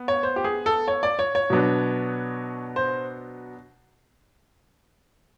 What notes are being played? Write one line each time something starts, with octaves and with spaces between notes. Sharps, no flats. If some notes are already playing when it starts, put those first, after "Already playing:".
Already playing: B3
C#5
C5
G4
G#4
A4
C#5
D5
C#5
C#5
B2 F#3 B3 D4
C5